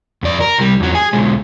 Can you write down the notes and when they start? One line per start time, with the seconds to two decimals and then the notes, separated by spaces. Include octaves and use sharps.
0.23 F2 D5
0.41 A#4
0.58 C2 G3
0.80 E2 F#3
0.95 G#4 G#5
1.13 B1 G#3